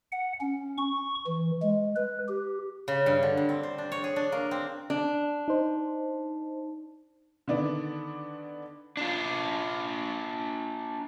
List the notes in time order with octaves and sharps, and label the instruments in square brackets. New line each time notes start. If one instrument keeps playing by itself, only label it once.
[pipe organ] F#5
C#4
C#6
E3
G#3
B4
G4
[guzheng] C#3
G2
D3
G2
C4
C5
D4
C#5
G#4
D4
A#3
C4
[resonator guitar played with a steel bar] D4
[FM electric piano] D#4 C5
[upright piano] D3 D#3 B3 D4 D5
[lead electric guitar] D4 F4